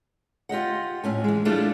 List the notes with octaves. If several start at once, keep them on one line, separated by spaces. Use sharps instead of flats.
F4 G4 D#5 F#5
D2 A2 C#4 G#5
E3 G#3
G3 A3 D4 E4 F4 G#4